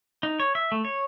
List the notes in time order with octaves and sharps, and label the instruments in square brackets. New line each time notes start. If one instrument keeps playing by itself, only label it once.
[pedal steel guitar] D#4
C#5
E5
A3
C#5